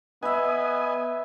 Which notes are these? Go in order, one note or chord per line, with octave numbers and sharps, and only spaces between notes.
B3 B4 D#5 E5 G#5